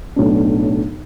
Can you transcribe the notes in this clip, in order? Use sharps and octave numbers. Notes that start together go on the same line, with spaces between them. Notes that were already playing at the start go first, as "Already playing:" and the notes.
B1 A2 F#3 B3 D4